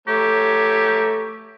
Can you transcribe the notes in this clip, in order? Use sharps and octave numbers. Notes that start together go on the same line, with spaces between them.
A3 G4 C#5 A#5